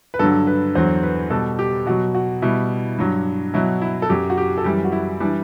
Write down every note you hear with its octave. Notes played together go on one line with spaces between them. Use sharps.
B4
G2 D3 F#3 A4
B4
E2 D3 F#3 C5
B4
B2 G3 A4
G4
B2 F#3 F#4
F#4
B2 G3 E4
G2 F#3
B2 F#3 E4
E4
A4
F#2 F#3 G4
F#4
G4
A4
F#2 E3 G3 G4
F#4
E4
E3 G3 D4